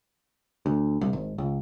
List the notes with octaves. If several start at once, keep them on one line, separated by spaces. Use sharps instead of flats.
D2
C2
G#1
C#2